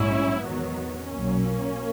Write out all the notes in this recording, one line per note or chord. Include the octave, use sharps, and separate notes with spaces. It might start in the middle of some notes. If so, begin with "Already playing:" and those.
Already playing: A#1 G#2 F#3 C#4 E4
E2 D#3 F#3 B3
B1 A#2 F#3 A#3 C#4